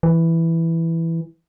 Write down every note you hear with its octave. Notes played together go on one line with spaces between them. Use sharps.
E3